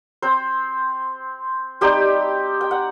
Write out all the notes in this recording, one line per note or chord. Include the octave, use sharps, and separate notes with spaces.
C4 C5
G3 C4 D#4 G4 G5
G5
F#5